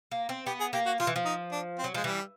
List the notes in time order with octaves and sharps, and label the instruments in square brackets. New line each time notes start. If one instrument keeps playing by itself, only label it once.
[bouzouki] A#3
C4
[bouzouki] B3 [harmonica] G4
[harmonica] G#4
[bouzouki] A#3 [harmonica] G4
[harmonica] F#4
[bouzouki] F3 [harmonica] F4
[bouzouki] E3
F3
[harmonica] D#4
D4
C4
[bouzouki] F#3
[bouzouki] F3 [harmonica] G#3
[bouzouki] E3 [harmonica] G3